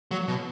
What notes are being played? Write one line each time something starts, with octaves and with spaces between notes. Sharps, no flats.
F#3
B2